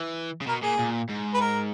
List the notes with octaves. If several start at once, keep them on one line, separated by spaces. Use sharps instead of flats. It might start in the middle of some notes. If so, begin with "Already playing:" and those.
Already playing: E3
C#3
B2 A#4
A#2 G#4
A#2
G#2
B4
A#4